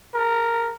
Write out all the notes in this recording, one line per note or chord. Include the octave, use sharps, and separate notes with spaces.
A#4